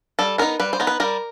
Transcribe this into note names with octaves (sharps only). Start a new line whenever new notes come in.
G3 A4
B3 D#4 A#4
G3 B4
C5
B3 D#4
B4
G3 A#4